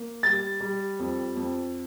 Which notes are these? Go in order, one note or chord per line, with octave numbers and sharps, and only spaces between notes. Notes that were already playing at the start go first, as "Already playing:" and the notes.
Already playing: A#3
G3 A6
G3
F2
F2